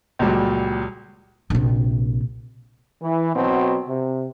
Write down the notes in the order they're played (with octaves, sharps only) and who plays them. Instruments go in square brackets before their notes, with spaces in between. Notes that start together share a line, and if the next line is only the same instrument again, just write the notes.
[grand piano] C#2 A#2 F#3 G3
[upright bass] A#1 C3
[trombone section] E3
B2 F#3 C4
C3